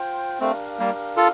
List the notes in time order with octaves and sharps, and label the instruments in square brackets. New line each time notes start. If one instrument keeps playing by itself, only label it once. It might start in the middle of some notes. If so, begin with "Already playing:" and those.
Already playing: [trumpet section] F4 C5 G5
[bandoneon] A3 C4 [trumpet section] D4 G4 A#4 F5
[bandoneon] G3 A#3
F4 A4